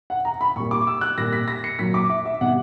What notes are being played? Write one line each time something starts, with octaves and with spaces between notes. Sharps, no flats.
F#5
A#5
B5
A#2 G3 C#6
D6
E6
F#6
A#2 G3 A#6
B6
A#6
C#7
A#2 F#3 B6
D6
E5
E5
B2 G3 F#5